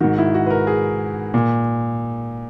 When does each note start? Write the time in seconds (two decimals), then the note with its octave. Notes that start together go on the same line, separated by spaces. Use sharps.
0.01 G#2 D#3 F#4
0.18 E4
0.34 F#4
0.47 B4
0.50 A#4
0.67 G#4
1.34 A#2